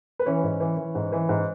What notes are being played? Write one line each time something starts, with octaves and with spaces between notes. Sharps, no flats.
B4
E3 C#4 C#5
G#2
E3
E3
G#2
E3
G#2